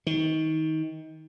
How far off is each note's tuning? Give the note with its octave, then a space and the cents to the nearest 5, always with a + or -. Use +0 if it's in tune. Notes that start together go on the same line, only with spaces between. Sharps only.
D#3 +25